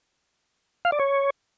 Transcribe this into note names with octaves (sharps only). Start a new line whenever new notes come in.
F5
D5
C#5